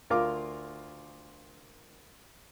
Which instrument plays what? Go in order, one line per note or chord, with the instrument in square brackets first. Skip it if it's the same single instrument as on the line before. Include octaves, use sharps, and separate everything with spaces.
[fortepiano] D2 F4 A#4 F5 D6